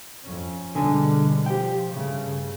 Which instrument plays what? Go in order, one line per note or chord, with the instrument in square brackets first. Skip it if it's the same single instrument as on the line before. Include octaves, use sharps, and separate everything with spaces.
[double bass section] F2 C#4
[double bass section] B2 G3 G#3 [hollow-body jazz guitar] D3 G#5
[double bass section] F3 [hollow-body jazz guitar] G4 G5
[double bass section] G2 C#3 A3
C#3